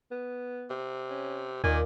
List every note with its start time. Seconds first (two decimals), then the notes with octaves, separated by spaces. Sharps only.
0.11 B3
0.70 C3
1.10 C#4
1.64 D#2 A#2 D#3 G#5 D6